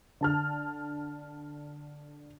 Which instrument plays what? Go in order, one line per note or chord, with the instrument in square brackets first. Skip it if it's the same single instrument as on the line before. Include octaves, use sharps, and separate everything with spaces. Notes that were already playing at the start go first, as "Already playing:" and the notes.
[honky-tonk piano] D3 A5 F6